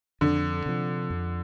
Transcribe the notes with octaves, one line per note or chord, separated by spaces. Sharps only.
F2 D3
C3 F3
F2